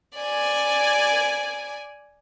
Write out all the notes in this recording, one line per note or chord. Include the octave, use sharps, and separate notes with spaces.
D5 G#5